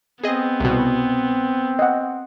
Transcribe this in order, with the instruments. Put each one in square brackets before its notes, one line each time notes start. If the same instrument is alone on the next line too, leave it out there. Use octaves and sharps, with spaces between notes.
[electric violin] B3 [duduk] C4 [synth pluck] G#4 D#5
[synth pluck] C2 B2
[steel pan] D#5 F#5